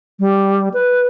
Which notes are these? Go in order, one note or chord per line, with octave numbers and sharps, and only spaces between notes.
G3
B4